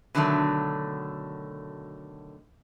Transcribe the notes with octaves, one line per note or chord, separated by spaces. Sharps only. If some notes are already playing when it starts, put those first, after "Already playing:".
B2 D3 D#3 F#3 A3